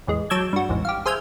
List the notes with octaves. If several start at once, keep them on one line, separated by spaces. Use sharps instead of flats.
A1 E2 G#3
F#3 A5 D6 E6 G6 G#6
G2 F#4
A1 E2 G#2
G4 F5
G#4 C5 E5 G#5 F6 G6